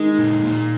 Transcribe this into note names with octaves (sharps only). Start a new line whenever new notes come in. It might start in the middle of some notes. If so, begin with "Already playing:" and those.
Already playing: D#3 G#3 D#4
A#2
A#2